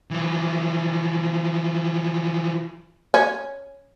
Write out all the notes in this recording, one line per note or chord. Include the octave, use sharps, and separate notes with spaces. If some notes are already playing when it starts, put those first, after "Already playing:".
E3 F3
C#4